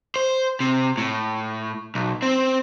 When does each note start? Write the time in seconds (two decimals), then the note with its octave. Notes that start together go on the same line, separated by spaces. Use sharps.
0.16 C5
0.60 C3
0.98 A2
1.95 B1
2.23 C4